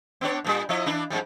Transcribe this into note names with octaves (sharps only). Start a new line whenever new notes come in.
B3 D4 C#5
E2 A#2 G3
F3 E4 D#5
E3 D4 E4
F2 G#2 G3